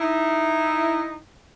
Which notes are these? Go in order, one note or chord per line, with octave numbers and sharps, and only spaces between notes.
D#4 E4